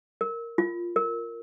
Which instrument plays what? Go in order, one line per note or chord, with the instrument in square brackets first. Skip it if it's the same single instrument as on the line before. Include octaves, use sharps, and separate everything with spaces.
[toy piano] A#4
F4
A#4